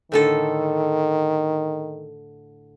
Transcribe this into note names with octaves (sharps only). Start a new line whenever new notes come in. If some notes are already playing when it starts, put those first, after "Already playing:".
A2 D3 D#3 A4